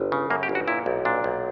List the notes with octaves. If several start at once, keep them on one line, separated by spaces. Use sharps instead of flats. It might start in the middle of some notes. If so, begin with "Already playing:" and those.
Already playing: G1
C#3
F#2 A#3
G4
G1
F#4
A#2 E4
B1
A#2 D4
B1